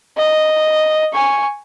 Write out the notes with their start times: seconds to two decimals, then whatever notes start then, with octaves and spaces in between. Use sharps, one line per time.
0.17 D#5
1.13 G#5 C#6